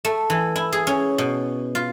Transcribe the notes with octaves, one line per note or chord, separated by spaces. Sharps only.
A3
E3
E4
G#4
C#4
B2
F4